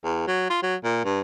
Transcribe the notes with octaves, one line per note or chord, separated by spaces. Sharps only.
E2
F#3
F4
F#3
A#2
G2